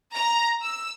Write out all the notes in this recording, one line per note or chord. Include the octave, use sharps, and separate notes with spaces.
A#5
E6